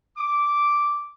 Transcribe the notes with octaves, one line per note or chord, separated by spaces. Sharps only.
D6